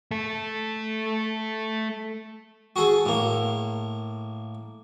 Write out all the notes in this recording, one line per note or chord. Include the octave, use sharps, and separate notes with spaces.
A3 A4
F#4 G#4 A4
A2 A#3